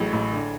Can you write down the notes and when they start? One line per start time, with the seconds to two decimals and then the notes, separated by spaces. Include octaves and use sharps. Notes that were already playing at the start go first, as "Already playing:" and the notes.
Already playing: A1 A2 F#3 G#4
0.13 A1
0.32 D3